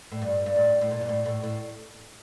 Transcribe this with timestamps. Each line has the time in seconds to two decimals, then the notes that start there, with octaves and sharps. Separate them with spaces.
0.12 A2
0.22 G2
0.46 G2
0.56 A2
0.81 A2
0.91 A#2
1.01 G2
1.09 A2
1.26 A2
1.43 A2